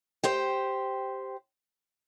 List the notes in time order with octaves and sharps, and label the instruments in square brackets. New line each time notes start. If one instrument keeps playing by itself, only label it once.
[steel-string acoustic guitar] G4 C5 G5